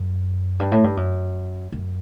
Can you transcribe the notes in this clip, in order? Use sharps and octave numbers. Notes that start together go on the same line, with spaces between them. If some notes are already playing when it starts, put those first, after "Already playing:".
Already playing: F#2
G2
A2
G2
F#2
F#2